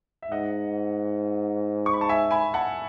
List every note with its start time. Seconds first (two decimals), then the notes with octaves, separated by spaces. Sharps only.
0.22 E5
0.31 G#2 D#5 F#5
1.86 C#6
1.93 B5
2.01 A5
2.09 E5 G#5
2.31 G#5 B5
2.54 F#5 A5